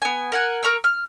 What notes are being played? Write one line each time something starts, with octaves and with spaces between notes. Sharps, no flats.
B3 G#5
A#4 F#5 G#5
A#4 A#5 C#6 E6
F6